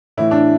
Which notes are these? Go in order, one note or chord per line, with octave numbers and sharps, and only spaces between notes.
A2 E3 E4
D4